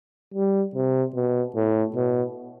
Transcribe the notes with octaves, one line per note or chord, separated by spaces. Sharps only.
G3
C3
B2
A2
B2